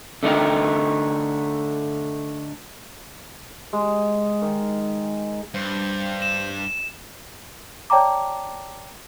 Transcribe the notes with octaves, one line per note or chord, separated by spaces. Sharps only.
D3 A3 D#4 A#4
G#3
D#3
G2 C5
E7
C#5 D5 G5 A5 A#5 D6